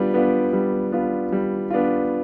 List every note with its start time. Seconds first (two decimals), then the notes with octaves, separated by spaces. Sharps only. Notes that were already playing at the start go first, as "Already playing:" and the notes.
Already playing: G3 B3 D4 F4
0.14 B3 D4 F4
0.53 G3
0.92 B3 D4 F4
1.32 G3
1.70 B3 D4 F4